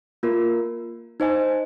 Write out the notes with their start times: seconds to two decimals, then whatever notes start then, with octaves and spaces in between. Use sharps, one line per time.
0.23 A#3 F4 A#4
1.20 D#4 C5 D#5 G#5